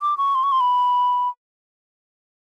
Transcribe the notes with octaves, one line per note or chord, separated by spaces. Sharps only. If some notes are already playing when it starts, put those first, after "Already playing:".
D6
C#6
C6
C#6
C6
B5